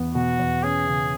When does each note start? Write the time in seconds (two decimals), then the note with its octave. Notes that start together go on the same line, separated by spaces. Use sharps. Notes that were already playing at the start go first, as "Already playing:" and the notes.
Already playing: E2 B3
0.15 B2 F#4
0.39 E2
0.63 C#4 G#4
0.87 C#3